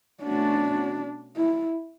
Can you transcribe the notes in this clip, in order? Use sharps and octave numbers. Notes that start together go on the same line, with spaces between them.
B2 A3 C#4 D4 F#4
E4